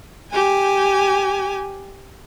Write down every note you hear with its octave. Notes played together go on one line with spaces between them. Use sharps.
G4 G#5